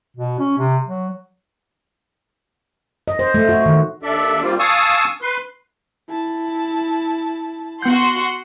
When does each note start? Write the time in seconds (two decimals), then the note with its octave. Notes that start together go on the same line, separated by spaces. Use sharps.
0.17 B2
0.39 C#4
0.58 C3
0.87 F#3
3.08 D#5
3.19 C5
3.34 A3
3.49 F#4
3.66 D#3
4.03 D#2 D4 A4 D5 E5
4.42 G3 A#3 C4 F4
4.59 F5 G#5 A5 C#6 D#6 E6
5.22 B4 C6
6.09 E4 A5
7.83 B3 F#4 F#5 C6 G6